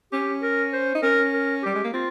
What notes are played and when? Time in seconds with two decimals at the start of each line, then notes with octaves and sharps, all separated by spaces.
0.12 C#4 G4
0.42 A#4
0.73 C5
0.95 D#4
1.02 C#4 A#4
1.33 A#4
1.63 G3 G4
1.75 G#3
1.84 A#3
1.93 C4 F4